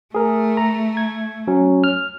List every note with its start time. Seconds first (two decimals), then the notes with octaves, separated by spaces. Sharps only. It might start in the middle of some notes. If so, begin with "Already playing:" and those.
0.15 A3 G#4 A#4
0.57 A#5
0.97 G#6
1.48 F#3 C#4
1.84 F6